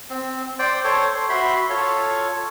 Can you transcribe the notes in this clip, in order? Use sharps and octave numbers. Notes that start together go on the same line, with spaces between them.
C4
C5 D5 G5
A4 C5 C#5
C5
F#4 E5 B5 C6
F4 A4 C#5